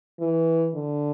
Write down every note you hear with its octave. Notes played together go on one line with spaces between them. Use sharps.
E3
D3